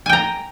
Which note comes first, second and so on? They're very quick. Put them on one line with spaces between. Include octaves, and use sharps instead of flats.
G#5 G5 A#5